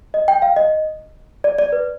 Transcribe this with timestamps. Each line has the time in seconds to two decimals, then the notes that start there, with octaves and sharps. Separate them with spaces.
0.14 D#5
0.28 G5
0.42 F5
0.56 D#5
1.44 D5
1.58 D5
1.72 B4